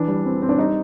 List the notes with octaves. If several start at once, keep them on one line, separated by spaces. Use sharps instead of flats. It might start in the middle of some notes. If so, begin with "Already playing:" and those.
Already playing: E3 D4
G3
C4
C4
D4
G3 D#4